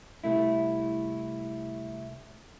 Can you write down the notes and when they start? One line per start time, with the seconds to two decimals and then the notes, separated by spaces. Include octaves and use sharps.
0.24 C2 A3 E4